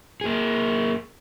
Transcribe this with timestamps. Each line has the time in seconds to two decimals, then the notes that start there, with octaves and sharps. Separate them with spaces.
0.21 A#3 G#4